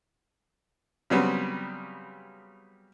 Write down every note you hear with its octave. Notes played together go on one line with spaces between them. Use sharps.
C#3 F#3 G3 B3 C4